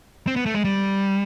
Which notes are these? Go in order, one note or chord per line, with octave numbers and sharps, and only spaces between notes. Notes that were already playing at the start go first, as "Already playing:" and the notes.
C4
B3
A3
G#3
G3